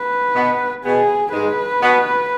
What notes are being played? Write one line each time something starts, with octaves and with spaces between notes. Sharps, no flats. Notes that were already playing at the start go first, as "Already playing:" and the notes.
Already playing: B4
B2 B3
B2 B3 G#4
G#2 G#3 B4
B2 B3